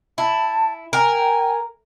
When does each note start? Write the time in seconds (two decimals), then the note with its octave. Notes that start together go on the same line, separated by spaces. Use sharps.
0.18 E4 A5
0.93 A#4 G5 G#5